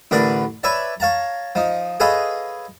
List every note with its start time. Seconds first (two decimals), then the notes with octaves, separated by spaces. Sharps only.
0.11 A1 D3 D4 A#4 B4 D5
0.63 B4 C#5 D5 E5 A5
1.00 C#5 F5 A5 A#5
1.55 F3 D#4
2.00 G#4 A4 B4 C#5 D#5 F5